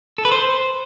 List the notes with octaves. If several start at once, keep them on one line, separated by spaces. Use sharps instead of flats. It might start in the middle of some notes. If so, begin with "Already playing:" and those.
A4
B4
C5